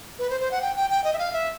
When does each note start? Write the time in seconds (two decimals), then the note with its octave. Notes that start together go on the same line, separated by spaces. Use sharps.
0.19 B4
0.30 C5
0.40 C5
0.51 F#5
0.62 G5
0.76 G5
0.90 G5
1.04 D#5
1.13 E5
1.19 F5
1.33 E5